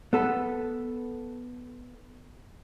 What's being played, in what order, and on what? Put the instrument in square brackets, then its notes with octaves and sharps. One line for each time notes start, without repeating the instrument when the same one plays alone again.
[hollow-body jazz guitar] B3 A4 B4